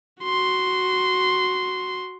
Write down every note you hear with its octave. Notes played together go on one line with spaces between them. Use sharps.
F#4 C6